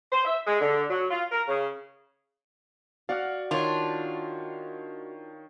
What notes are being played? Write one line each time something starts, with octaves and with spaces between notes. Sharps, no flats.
C5
E5
G#3
D3
F#3
F4
A#4
C#3
F#4 D5 F5 F#5 F6
D#3 D4 F4 C#5